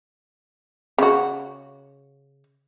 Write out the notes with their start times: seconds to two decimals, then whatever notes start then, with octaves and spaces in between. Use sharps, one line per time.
0.98 C#3 F#4